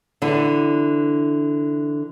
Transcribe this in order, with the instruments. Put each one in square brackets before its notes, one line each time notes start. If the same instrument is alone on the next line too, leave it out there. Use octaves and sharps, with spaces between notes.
[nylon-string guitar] D3 E3 D4